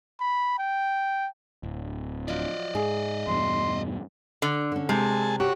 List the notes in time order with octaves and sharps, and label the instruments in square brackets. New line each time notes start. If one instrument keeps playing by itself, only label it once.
[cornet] B5
G5
[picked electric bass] D1
[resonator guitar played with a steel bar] F3 F#3 [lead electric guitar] D5 D#5
[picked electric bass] G#2 [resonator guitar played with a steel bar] G#4
[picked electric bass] E2 G2 B2 [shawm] C6
[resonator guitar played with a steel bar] D3
[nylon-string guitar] D3 C#4
[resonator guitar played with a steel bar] C3 [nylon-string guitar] G#3 [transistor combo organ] G#4 A5
[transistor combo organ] F#4 C#5 [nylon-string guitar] G4